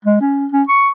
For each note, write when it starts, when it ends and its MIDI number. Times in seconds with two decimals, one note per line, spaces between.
0.05 0.18 56
0.21 0.47 61
0.52 0.63 61
0.68 0.90 85